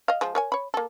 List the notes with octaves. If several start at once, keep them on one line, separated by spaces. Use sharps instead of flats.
D#5 F5
F3 G#3
A#4 C#5 G#5
C#5 B5
A#3 A4